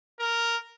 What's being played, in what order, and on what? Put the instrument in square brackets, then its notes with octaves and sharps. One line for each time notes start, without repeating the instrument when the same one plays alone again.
[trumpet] A#4